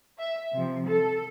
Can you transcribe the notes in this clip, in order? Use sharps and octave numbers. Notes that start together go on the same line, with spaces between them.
E5
C3 F3
A4